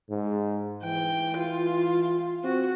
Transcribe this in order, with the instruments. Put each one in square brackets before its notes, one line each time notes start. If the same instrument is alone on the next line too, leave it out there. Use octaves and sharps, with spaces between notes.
[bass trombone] G#2
[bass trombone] E3 [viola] G5
[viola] F4
[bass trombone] C4 [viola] F#4